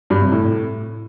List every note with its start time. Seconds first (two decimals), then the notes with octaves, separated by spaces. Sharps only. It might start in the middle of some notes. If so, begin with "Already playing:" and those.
0.10 G2
0.21 C3
0.32 A2